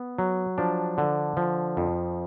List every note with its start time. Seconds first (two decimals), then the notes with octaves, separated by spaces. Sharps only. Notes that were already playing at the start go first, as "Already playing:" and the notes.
Already playing: B3
0.18 F#3
0.58 F3 D4
0.98 D3
1.37 F3
1.77 F2